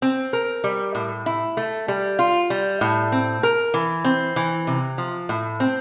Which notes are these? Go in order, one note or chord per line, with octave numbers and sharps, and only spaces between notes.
C4
A#4
G3
A2
E4
A3
G3
F4
G3
A2
C4
A#4
E3
C4
E3
C3
F3
A2
C4